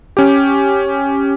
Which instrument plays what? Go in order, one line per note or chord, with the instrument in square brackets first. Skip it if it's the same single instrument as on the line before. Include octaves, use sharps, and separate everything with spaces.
[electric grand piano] C#4 G4